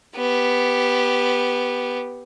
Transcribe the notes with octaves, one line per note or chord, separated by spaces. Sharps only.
B3 G4